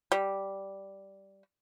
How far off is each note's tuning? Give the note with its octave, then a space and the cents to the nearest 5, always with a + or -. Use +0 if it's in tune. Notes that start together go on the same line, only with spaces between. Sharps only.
G3 -5